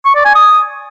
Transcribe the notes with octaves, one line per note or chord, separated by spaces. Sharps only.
C#6
D5
G#5
D#6